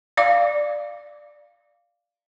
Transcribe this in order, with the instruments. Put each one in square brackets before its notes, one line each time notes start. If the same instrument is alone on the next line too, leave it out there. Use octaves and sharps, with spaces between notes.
[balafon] D5 F5 D6